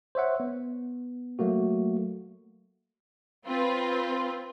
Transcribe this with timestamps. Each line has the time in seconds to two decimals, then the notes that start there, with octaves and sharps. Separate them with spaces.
0.15 C5 C#5 E5 F#5
0.40 B3
1.39 F#3 A3 A#3 F#4
3.45 C4 F4 B4